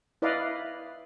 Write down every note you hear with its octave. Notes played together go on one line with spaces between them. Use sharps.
E4 B4 D5 D#5 F5